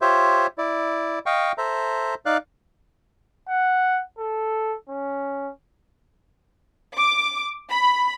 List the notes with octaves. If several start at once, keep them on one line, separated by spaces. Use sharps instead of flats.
F4 G4 C5 C#5 E5
E4 D5
D#5 F5 G5 C#6
A4 C5 E5 A#5
D#4 D5 F5 F#6
F#5
A4
C#4
D6
B5